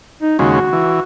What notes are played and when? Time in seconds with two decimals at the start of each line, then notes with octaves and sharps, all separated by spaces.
0.22 D#4
0.39 D#2 C#3 G#3 F#4
0.73 E3